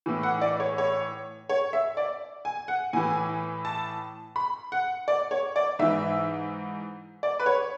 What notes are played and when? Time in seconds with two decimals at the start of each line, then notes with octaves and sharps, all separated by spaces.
0.06 A2 E3
0.23 F#5
0.42 D5
0.60 C#5
0.78 C#5
1.50 C#5
1.73 E5
1.97 D5
2.45 G#5
2.68 F#5
2.93 A2 E3 G#5
3.65 A5
4.36 B5
4.72 F#5
5.08 D5
5.31 C#5
5.56 D5
5.79 G#2 E3 E5
7.23 D5
7.40 B4
7.46 C#5